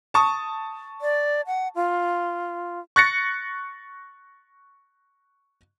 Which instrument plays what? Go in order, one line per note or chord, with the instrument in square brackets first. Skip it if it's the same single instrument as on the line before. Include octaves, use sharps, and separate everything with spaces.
[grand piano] A5 C#6 D#6
[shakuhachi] D5
F#5
F4
[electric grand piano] C#6 F#6 A6 A#6 C#7